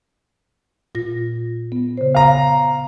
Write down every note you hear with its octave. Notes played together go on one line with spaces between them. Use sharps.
A#2 F4 A#6
B3
C#3 C5
C#3 F5 A#5